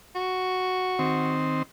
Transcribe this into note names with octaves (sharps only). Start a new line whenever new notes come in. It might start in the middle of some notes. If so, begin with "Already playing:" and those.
F#4
D#3 C4